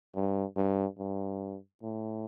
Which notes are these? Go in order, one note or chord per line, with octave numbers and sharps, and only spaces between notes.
G2
G2
G2
A2